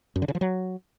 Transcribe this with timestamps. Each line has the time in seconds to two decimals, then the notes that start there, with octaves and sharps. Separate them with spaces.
0.16 F#2
0.22 D3
0.28 C#3
0.35 F3
0.41 F#3